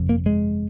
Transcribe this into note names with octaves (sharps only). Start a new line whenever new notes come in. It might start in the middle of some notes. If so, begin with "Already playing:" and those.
Already playing: G1 F2 C3
A#3
G#3